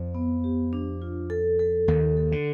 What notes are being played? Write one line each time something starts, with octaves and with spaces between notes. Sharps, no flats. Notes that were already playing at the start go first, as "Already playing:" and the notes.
Already playing: F2 F3
B3
G4
D4
F4
A4
A4
D#2 D#3 A4
A4
D3